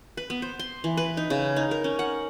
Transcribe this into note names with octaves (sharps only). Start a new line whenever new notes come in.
B4
B3
C5
C6
E3
B4
D#4
C#3
D#4
A#4
C#4
F#5